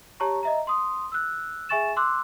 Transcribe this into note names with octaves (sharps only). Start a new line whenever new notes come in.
G4 C#5 A5 A#5 C#6
D#5 E5 A#5
C6 D#6
E6 F#6
G#4 E5 G#5 C#6 A6 E7
C6 D6 E6 F#6